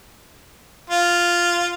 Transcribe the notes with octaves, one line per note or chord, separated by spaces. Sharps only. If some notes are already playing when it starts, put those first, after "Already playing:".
F4